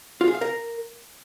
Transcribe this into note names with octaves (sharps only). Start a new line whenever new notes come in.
F4
G#4
F5
A#4